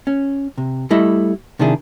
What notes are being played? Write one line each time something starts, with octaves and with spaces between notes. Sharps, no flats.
C#4
C3
G3 A3 E4 D#5
C3 D#3 F3 D4 E4 G#4